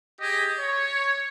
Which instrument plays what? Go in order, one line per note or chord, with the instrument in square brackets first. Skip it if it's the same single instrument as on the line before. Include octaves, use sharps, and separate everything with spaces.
[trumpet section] G4 G#4 D#5
C#5